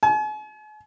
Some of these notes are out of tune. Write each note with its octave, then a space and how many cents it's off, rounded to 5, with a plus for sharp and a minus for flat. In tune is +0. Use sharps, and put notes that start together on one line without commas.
G#5 +45